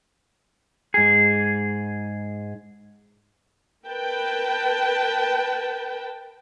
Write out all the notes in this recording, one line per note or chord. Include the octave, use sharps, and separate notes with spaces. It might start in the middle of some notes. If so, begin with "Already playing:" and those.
G#2 G#4
A#4 B4 G5 A5